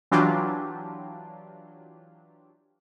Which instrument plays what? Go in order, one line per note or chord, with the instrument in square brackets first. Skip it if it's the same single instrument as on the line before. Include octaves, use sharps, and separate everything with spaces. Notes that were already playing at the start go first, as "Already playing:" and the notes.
[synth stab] E3 F#3 D4 F4 G4